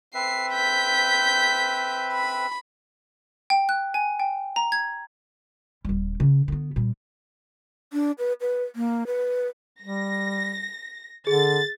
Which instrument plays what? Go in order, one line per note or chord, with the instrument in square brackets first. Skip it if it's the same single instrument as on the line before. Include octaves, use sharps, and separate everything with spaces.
[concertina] C4 B4 E5 [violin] C7
[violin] G6 B6
B5
[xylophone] G5
F#6
G#5
G5
A#5
G#6
[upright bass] D#1 G3
C#3
D3 B3
A#2 G3
[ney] D4
B4
B4
A#3
B4
[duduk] G3 [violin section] A#6
[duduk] D3 [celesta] G#4 [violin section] A6